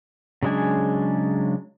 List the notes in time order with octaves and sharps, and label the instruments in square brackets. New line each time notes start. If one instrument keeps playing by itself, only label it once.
[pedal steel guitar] C#3 F#3 G#3 D4 G#5